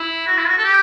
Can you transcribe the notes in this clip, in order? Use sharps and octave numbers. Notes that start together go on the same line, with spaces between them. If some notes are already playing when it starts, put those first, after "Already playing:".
Already playing: E4
F#4
E4
F#4
A4
G4